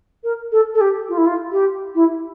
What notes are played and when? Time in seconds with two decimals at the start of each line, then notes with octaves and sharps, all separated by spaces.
0.24 A#4
0.52 A4
0.74 A4
0.81 G4
1.09 F4
1.17 E4
1.26 F4
1.52 G4
1.95 E4